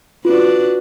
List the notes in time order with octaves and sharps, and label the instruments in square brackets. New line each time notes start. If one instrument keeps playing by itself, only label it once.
[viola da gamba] D4 F#4 B4 [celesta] F4